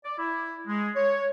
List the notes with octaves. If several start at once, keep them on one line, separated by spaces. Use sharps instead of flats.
D5
E4
G#3
C#5